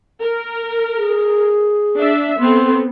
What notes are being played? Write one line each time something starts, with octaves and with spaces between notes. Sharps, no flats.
A#4
G#4
D4 E5
B3 C4 A4 C6